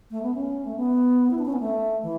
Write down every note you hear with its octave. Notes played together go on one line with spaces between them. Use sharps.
A3
B3
C#4
A3
B3
E4
D4
C#4
B3
A3
E3